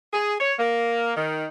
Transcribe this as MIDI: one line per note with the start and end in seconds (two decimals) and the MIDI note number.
0.13 0.35 68
0.40 0.54 73
0.59 1.12 58
1.16 1.47 51